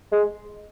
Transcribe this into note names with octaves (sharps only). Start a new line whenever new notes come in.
G#3